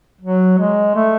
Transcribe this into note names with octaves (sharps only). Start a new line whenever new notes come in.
F#3
G#3
A3